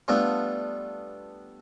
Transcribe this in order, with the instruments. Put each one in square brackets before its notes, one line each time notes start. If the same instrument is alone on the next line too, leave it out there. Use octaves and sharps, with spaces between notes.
[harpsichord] G3 A3 B3 D4 F4